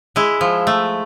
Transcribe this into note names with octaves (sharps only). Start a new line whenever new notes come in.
G#3 E4
F3
A3